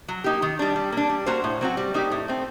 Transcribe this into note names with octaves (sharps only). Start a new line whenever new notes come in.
F#3
A#3 D#4 G4
D#3
G3 D4
G3
A#3 D4
G3
A#3 F#4 C5
A2
F#3 C4 F#4
G3
A#3 D#4 G4
A2
A3 C4